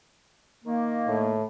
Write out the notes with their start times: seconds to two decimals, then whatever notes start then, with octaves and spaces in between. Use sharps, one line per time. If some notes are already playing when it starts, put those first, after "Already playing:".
0.64 D#3 A#3
1.07 A2